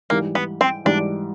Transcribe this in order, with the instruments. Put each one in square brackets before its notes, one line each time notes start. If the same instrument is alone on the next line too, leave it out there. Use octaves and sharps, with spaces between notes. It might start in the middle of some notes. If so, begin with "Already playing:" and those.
[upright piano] G#2 E3 G3 [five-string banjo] A#3
[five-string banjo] B3
C4
[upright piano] G#2 E3 G3 [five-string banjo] D4